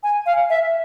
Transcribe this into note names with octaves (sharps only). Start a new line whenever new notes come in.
G#5
F5
E5